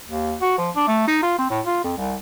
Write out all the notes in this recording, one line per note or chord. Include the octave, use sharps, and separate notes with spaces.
D#2
F#4
F3
D4
A3
D#4
F4
C4
A2
F4
F2
C2